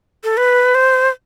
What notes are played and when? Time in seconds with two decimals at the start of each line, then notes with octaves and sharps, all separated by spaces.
0.24 A4
0.37 B4
0.75 C5